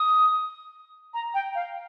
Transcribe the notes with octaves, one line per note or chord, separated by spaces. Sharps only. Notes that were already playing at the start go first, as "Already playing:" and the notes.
Already playing: D#6
A#5
G5
F5